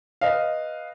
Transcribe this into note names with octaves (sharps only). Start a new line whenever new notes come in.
B4 D#5 F5